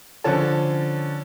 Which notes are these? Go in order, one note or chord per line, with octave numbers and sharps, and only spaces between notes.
D3 F3 C#4 A4